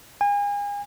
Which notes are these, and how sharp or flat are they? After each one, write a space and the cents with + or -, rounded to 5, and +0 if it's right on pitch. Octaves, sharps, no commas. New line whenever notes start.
G#5 -35